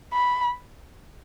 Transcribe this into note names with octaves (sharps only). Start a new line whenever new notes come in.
B5